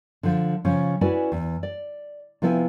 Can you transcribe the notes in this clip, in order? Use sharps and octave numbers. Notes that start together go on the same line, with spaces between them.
D3 F3
C#3 F3 C#4
C#4 E4 F#4 B4 D5 G#5
E2
D5
C3 F3 B3 E4 F5 G#5